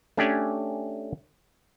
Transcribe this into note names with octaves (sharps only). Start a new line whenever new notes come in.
A3 C#4 D4 G4 D5 G#5